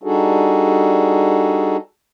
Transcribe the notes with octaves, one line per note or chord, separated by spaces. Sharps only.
G3 D4 D#4 F#4 G#4 A4